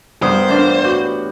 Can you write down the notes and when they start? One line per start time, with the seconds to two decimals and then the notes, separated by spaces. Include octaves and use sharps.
0.23 G2 B3 A#4 C5 D#6
0.48 A2 E3 D4 F4
0.84 F#4 G4 G6